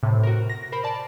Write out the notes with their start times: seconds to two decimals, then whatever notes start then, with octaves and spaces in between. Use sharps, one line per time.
0.03 A2 C3
0.23 F#4 A#4
0.50 A#6
0.72 A#4 C5 B5
0.84 D5 A5